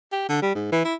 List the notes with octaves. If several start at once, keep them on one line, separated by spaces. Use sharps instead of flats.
G4
D3
G3
G#2
E3
E4